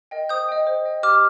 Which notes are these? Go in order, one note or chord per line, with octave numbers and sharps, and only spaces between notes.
A#4 D#5 G5
C5 D#6 G6
D#5 G5
C5
D#5 G5
G4 D6 F6